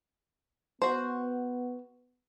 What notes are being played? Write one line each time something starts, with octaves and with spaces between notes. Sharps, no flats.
B3 F#4 C5